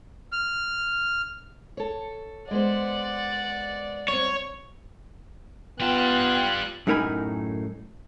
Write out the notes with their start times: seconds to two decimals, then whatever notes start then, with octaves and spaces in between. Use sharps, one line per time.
0.32 F6
1.77 A4 C#5
2.51 G#3 B3 C5 D5 F#5
4.08 G3 C4 C#5
5.80 G3 B3 F4 G5 A5 F#6
6.87 F#2 A2 D#4 A#4 G#5 B5